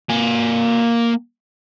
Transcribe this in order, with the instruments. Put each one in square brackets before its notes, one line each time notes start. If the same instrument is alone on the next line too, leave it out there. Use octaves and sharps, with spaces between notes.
[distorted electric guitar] A#3 G#5